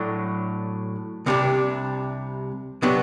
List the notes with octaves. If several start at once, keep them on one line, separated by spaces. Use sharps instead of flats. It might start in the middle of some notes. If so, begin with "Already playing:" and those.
Already playing: A2 F#3 A3 D4
C2 C3 G3 D4
C3 F#3 B3 D4